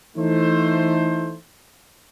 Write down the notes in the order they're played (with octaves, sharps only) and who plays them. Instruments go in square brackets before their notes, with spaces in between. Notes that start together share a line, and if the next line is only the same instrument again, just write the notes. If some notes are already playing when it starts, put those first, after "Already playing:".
[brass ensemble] E3 A3 D#4 C5